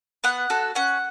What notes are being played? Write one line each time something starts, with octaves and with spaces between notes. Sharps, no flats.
B3 F#5
F#4 A4
C#4 F#5